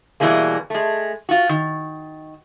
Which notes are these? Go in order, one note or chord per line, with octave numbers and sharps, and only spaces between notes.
B2 E3 G3 G#3 A#3
G#3 A3
F4 F#4
D#3